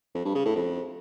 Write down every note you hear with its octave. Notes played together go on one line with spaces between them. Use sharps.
F2
G2
C#3
A2
F2